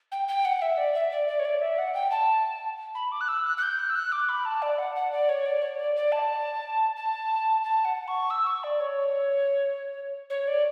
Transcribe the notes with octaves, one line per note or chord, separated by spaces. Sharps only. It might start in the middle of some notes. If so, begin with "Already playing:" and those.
G5
G5
F#5
E5
D5
E5
D5
D5
C#5
D5
E5
F#5
G5
A5
B5
D6
F#6
E6
F#6
F#6
G6
F#6
E6
F#6
D6
B5
A5
D5
F#5
F#5
D5
C#5
D5
C#5
D5
D5
A5
A5
A5
F#5
C#6
E6
C#6
D5
C#5
C#5
D5